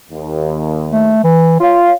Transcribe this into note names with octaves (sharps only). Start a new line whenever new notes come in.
D#2
A3
E3
F4 C#5 F5